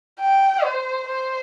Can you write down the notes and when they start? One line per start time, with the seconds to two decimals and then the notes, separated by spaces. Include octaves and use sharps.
0.20 G5
0.64 C5
1.07 C5